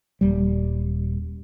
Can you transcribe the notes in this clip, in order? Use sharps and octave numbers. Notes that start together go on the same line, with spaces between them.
D#1 G3